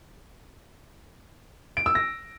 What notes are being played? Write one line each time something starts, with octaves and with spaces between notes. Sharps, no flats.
D7
E6
A#6